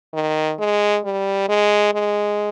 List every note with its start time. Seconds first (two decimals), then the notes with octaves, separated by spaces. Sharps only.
0.13 D#3
0.59 G#3
1.05 G3
1.49 G#3
1.94 G#3